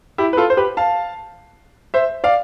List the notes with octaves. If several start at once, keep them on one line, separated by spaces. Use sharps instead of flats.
E4 G4
B4
F4 A4
C5
G4 B4
F5 A5
C5 E5
D5 F5